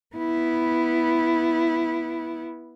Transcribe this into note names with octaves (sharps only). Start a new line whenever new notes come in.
B3 E4